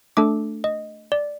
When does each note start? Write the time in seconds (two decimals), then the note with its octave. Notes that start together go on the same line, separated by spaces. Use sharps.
0.17 A3 D4 A4 D6
0.64 D#5
1.12 D5